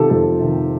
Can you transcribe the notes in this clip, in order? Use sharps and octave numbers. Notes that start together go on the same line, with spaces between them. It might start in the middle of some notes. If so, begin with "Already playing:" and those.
Already playing: C3 D#3 F4 G4 A4
F2 A4
C3 D#3